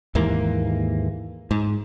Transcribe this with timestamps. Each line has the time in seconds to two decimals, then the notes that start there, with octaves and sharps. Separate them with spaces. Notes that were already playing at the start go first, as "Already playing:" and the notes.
0.15 D#2 G#2 E3 A#3
1.51 G#2